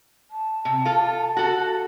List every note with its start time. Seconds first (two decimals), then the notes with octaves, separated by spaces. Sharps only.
0.31 A5
0.65 C3
0.85 F4 A4
1.36 F#4 A4